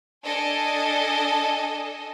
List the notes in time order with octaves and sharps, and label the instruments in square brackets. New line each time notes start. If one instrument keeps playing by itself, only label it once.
[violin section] D4 A4 D#5 G#5